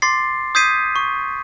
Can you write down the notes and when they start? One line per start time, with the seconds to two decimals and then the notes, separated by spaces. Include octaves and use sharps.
0.02 C6 D6 A6 C7
0.55 D#6 G6 G#6 B6 C7 D#7
0.96 C#6